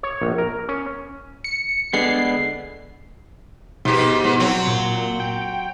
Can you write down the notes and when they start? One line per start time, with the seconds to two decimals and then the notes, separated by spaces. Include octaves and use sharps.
0.03 C#5
0.22 A#1
0.38 A#4
0.69 C#4
1.44 C#7
1.93 D3 G#3 B3 C7
3.85 G#2 B2 G4
4.24 G#2
4.40 F#3 C4 F#4
4.67 A#2
5.20 G5